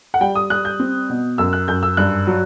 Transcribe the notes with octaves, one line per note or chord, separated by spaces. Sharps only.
F#5
G3 G5
D#6
G3 F#6
G6
C4
B2
F#2 E6
F#6
F#2 G6
E6
G2 F#6
F#3